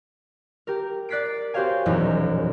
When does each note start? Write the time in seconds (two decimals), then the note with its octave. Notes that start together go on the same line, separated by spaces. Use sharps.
0.67 G4 A#4
1.09 D5 F#6 A6 B6 C7 D7
1.54 F#4 G4 C5 C#5 F5 G#5
1.86 E1 A#1 F#2 D#4